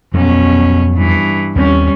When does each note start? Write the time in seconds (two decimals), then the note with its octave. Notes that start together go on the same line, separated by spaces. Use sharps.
0.14 F2 B2 F#3 A#3 C#4
0.93 G2 E3
1.56 D#2 G3 A3 C4 C#4